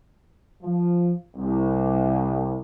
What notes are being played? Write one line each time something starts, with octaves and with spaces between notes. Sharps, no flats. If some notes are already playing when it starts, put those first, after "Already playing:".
F3
C2